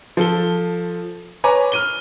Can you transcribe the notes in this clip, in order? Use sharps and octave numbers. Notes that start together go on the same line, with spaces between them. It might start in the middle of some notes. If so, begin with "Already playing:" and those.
F3 A4 G7
B4 C#5 G#5 A#5 D6
F6 D#7 G7